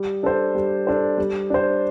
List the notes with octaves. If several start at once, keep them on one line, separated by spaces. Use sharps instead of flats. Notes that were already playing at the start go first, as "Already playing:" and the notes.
Already playing: G3
D4 A4 C5
G3
D4 A4 C5
G3
D4 C5